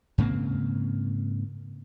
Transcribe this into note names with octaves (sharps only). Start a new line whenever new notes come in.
G#2 C#3 A#3 C4